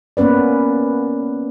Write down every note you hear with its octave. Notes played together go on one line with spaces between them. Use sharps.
A#3 B3 C#4 B4 D5